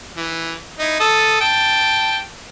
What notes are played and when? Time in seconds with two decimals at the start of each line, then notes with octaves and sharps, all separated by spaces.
0.17 E3
0.79 D#4 E4
1.00 A4 D#6
1.40 G5 A5